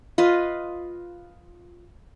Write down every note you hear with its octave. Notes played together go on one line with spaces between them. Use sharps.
F4 B4 D#5